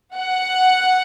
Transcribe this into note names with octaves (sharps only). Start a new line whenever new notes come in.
F#5